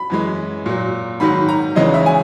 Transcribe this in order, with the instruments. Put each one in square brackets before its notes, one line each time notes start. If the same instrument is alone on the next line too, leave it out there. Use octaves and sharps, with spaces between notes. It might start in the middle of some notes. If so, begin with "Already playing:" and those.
Already playing: [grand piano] B5
F#2 E3 G#3
A#2 F#3
G#2 D#3 F#3 B5
A#5
E2 C#3 E3 G#3 D#5
E5
G#5